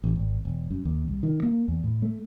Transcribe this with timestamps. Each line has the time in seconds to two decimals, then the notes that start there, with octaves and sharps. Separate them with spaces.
0.04 A1
0.16 G#1
0.45 E1
0.71 F#2
0.85 D#2
1.08 C2
1.23 D#3
1.43 A#3
1.68 E2
1.84 A2
2.02 A3